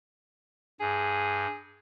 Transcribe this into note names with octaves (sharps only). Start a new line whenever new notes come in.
G2 G#4